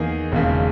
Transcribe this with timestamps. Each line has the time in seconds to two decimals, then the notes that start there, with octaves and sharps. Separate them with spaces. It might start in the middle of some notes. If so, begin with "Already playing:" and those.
Already playing: E2 D#3 A#3 D#4 G#4
0.32 E1 D#2 C#3